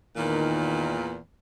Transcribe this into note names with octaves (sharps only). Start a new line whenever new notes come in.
E2 A#2 D#3